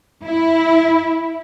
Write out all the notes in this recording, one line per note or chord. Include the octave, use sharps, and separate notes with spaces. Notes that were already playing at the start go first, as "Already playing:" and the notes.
E4